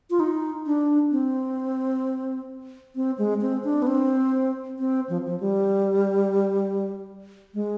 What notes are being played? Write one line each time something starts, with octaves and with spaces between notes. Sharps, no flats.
F4
D#4
D4
C4
C4
G#3
C4
D4
B3
C4
C4
F3
F3
G3
G#3